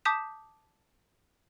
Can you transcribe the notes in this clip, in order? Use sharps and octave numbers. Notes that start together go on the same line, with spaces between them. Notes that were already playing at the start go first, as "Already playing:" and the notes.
A5 D6 D#6 G6 B6 E7